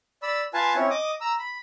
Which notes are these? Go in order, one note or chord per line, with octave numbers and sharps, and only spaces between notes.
D5 B5 E6
F4 B4 F5 G#5 A5
C4 C#4 E4 C#5
D#5 D6 D#6
A#5 E6
B5